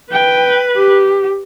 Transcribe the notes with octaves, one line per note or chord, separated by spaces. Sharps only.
B4 G5
G4